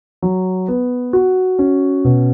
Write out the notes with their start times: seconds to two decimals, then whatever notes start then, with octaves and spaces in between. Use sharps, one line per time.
0.22 F#3
0.68 B3
1.13 F#4
1.59 C#4
2.04 B2